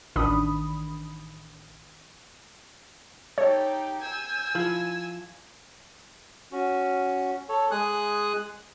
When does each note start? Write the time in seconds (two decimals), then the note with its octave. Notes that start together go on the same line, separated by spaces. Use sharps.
0.16 A1 D#3 D4 B5 D#6
3.38 D#4 G4 A4 C#5
4.02 G#5 E6 G6
4.55 F3 E4 F5 G#6
6.52 C#4 F#4
7.49 A4 C#5
7.71 G#3 G#4 G#5 D#6 F#6